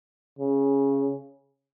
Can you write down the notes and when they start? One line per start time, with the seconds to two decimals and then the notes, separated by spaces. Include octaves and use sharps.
0.39 C#3